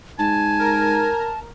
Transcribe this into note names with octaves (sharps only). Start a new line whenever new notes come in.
G#2 G#5 A5
A#4